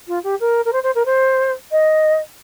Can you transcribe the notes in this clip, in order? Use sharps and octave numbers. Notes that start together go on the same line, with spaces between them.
F4
G4
A#4
A#4
C5
C5
A#4
C5
D#5